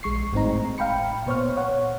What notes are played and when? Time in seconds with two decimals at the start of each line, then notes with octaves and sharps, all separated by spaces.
0.03 A#1 G#3 C#6 C7
0.33 G#1 A2 G#3 C4 D#4 A#5
0.78 F5 G5 B5 C#7
1.26 A#2 B3 C5 C#5 C#6 F6
1.57 C#5 F#5